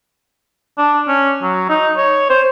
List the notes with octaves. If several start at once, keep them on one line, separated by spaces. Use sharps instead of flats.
D4
C#4
F#3
D#4
C#5
C5